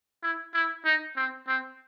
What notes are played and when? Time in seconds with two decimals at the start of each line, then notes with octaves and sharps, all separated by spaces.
0.23 E4
0.54 E4
0.85 D#4
1.17 C4
1.48 C4